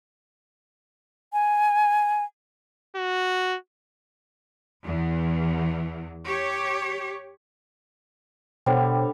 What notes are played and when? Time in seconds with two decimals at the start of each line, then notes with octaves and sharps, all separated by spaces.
1.33 G#5
2.96 F#4
4.84 E2
6.25 G4 C#5
8.66 B2 D3 G3 C5 C#5 G5